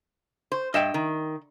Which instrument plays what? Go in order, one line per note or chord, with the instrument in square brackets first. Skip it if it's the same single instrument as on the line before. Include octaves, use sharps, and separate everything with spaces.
[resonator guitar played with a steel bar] C5
[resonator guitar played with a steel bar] G2 [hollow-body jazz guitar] D#5 E5 G5
[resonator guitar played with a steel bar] D#3